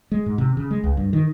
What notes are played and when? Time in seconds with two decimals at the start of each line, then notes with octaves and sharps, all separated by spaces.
0.12 G#3
0.26 G#2
0.38 C3
0.57 C#3
0.71 G#3
0.84 C#2
0.97 G2
1.13 D#3